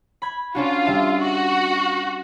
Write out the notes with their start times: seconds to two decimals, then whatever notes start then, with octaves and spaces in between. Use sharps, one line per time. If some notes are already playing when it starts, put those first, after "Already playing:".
0.22 B5 G#6
0.55 C#4 D4 F4 F#4
0.85 G3 A4 E5
1.21 F#4